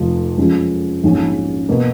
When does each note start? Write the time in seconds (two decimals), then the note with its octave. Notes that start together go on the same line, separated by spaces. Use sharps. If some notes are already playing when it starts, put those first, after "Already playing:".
Already playing: F1 F2 F3
0.38 F#2 F3 G#3 C#4 F4
1.03 A#1 G#2 F#3 C#4
1.69 B2 A#3